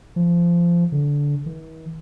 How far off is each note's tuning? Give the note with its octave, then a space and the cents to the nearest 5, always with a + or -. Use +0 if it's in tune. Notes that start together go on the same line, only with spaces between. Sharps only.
F3 -20
D3 -20
E3 -45